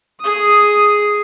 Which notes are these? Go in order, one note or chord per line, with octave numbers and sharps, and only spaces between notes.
G#4 D#6